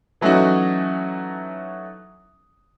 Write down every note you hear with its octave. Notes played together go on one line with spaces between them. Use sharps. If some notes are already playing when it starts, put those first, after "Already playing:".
E3 F#3 A3 C#4 D#4 F#4